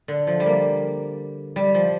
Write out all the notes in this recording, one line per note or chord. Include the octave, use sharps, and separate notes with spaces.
D3
F3
G3
A#3
G3
F3